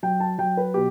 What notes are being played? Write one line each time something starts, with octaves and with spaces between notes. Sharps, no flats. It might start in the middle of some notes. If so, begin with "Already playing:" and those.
F#3 G5
A5
F#3 G5
B4
B2 G4